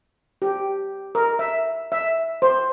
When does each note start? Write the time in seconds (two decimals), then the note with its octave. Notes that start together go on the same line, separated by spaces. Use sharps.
0.42 G4
1.15 A#4
1.39 E5
1.92 E5
2.42 C5